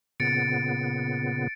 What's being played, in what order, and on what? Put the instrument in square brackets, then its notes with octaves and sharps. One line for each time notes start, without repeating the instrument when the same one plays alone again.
[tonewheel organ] A#2 C#3 B3 [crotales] A6 C#7 D7